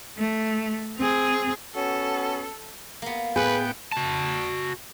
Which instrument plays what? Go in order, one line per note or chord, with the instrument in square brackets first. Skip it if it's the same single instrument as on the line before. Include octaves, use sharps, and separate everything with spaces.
[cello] A3
C4 G#4
[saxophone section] B3 C#4 F#4 [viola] A4
[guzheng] A#3 B3
[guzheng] A2 [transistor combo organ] B3 G5 [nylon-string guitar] G#4 [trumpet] B4
[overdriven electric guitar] F#4 A5